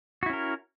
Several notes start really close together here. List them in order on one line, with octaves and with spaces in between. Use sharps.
F#4 E4 C#4 A#4